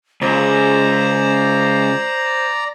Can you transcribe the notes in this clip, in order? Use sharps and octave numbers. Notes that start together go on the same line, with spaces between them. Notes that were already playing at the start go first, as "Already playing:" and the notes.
C#2 C5 D5 A#5